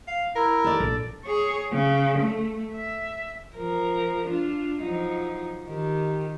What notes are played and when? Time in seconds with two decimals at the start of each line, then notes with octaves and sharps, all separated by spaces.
0.08 F5
0.36 E4 A#4
0.64 A4 D5
0.80 A#1
1.25 G#4 C#5
1.71 C#3
2.18 A3
2.72 E5
3.55 F3 A#4
4.25 D4 F4
4.82 F3 F#3 D#4
5.67 D#3 G4